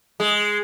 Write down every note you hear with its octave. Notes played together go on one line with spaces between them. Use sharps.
G#3